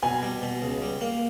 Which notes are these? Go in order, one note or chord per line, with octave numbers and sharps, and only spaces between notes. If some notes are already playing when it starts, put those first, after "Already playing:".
B2 G#5
G3
B2
C#2
G3
A#3